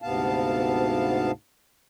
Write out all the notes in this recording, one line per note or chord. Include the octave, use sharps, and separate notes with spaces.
D2 G#2 C3 B3 F5 A5